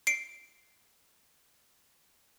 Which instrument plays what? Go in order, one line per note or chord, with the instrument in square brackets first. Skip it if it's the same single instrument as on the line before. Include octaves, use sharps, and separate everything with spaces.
[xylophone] C7 D7